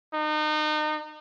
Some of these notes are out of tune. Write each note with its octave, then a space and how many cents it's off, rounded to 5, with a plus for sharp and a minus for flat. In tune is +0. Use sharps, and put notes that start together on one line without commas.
D#4 -35